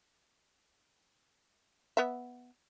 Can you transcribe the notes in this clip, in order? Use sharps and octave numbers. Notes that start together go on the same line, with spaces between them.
B3 E5